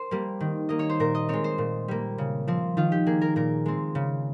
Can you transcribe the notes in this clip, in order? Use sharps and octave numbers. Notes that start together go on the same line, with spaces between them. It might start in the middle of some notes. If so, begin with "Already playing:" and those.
Already playing: A#4 C5
G3 A#3
D#3
A#3 D#5
C#5
C5
A#2 A#4
D#5
G#3 C4 C#5
C5
A#2
G3 A#3
C#3
F3 C4
D#3 F4
G4
A#3 G#4
A#4
A#2 A#4
G#3 C4
C#3